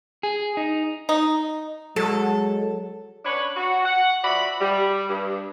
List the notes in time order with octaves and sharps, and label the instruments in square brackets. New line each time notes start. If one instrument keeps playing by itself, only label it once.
[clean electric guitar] G#4
D#4
[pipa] D#4
[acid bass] F#3 [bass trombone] G#3 [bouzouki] A4
[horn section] C#4 D4 B4 C#5
F#4
F#5
F3 F#4 D5 E5 B5
G3
G2